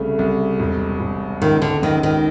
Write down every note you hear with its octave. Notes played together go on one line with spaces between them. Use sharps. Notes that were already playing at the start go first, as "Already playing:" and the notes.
Already playing: C2 C#3 A3
C2
E1
E1
C#2 D#3
D3
C#2 D#3
D#3